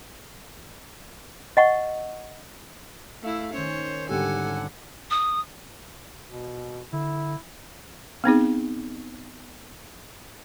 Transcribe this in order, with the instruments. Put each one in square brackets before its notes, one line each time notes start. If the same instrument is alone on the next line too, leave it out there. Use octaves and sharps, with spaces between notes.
[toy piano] D#5 F#5 C#6
[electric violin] A3 E4 [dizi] F5
[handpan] D#3 C#4 [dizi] C5 [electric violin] C#5
[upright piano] G#1 D3 G3 [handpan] G4 [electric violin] A4 G#5 [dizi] F#5
[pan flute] D#6
[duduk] B2
[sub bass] D3 [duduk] E4
[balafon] B3 C4 D#4 G#4